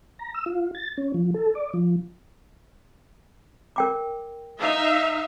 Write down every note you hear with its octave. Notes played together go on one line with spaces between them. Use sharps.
A#5
E6
F4
A6
C#4
F3
A4
D5
F3
A#4 G5 D6
D#4 E5 F5